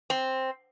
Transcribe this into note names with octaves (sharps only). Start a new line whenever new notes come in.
C4